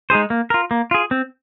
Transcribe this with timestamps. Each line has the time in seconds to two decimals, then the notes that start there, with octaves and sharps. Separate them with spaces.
0.10 G#3 D#4 G#4 C5
0.30 A#3
0.50 F4 A#4
0.71 A#3
0.91 F4 G#4
1.11 C4